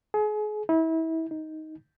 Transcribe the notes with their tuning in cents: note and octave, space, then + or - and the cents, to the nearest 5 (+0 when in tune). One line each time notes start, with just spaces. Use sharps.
G#4 +35
E4 -30
D#4 +10